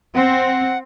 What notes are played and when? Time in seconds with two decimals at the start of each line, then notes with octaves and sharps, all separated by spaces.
0.15 C4 F#5